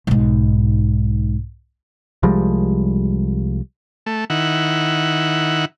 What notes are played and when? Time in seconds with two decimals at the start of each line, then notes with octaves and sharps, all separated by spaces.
0.07 B1 G#2
2.23 C2 F3 G3 G#3
4.06 A3
4.30 D#3 E4 F#5